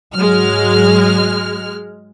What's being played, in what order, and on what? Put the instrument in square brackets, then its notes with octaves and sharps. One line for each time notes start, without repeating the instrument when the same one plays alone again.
[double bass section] G#2 F#3 [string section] G#3 F6